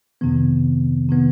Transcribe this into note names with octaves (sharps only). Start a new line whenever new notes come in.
F2 C3 D#3 B3
C3 D#3 B3